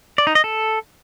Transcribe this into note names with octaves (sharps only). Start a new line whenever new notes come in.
D5
D#4
D#5
A4